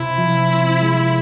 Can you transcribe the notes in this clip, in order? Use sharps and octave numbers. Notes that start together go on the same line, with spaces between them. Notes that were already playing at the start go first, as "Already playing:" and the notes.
Already playing: C3 E4
F3
C4
G#3